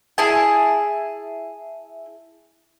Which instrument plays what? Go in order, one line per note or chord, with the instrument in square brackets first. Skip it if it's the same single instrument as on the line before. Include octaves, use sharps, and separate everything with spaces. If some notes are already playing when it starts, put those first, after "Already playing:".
[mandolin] E4 G#4 A5